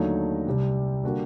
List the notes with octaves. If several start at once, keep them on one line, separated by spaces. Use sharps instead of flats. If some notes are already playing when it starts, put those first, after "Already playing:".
Already playing: D#2 D3 F#3 A3 D#4
C2 C3 G3
D3 G3 A#3 F#4